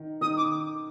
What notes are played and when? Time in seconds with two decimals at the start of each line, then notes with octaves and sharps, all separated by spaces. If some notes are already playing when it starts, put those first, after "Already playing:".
Already playing: D#3
0.21 D#3 D#6
0.37 D6